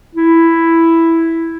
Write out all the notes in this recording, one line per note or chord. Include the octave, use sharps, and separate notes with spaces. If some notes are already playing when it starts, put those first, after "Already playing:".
E4